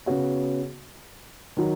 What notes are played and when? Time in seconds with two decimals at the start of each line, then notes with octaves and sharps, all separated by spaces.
0.06 C#3 B3 F#4 C#5
1.57 D#3 F#3